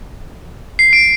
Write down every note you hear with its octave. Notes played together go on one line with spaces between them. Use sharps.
C7
D7